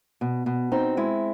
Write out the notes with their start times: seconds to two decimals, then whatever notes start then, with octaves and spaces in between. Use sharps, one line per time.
0.21 B2
0.46 B2
0.72 C4 D#4
0.97 G#3 E4